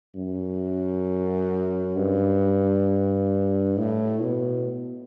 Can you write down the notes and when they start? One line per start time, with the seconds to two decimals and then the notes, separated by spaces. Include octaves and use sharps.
0.15 F#2
1.96 G2
3.77 A2
4.22 B2